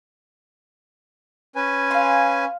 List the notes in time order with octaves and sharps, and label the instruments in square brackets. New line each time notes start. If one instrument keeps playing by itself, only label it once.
[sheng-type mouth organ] C#4 B4 G#5
[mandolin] F5 C6